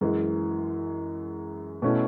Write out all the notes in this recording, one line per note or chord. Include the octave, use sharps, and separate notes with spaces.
F#2 E3 G#3
B2 A3 C#4 E4